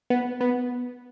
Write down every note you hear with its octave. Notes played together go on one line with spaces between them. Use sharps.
B3
B3